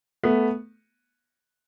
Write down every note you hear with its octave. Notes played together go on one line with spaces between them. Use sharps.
A3 B3